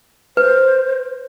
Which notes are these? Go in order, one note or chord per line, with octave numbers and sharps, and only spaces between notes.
B4 C5